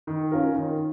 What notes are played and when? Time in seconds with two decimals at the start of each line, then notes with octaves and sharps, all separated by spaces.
0.07 D#3
0.32 C#4 F4 A#4
0.55 D#3